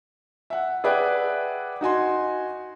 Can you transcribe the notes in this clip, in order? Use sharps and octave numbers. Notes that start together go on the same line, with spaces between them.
E5 F#5
G#4 B4 D5 E5 F#5 G5
D#4 F#4 G#5 C6